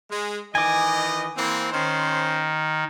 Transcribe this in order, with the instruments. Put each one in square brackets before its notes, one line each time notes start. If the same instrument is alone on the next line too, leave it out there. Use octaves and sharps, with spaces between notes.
[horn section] G#3
[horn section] D#3 E3 D#5 [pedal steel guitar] G#5 D6
[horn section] E3 A#3 C4
[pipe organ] D#3 [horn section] C#4 C5